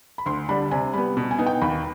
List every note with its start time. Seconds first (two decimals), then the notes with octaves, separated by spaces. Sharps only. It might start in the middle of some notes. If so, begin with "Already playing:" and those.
0.18 B5
0.26 D2 C6
0.49 D3 G3 D4 B5
0.71 C3 G#5
0.93 G3 B3 B5
1.17 B2
1.31 G#5
1.38 B3 D#4
1.46 G5
1.61 D#2 B5